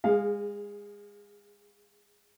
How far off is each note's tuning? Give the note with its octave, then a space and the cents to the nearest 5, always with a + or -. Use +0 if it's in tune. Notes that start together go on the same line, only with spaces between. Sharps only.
G#3 -25 G#4 +0 F5 +10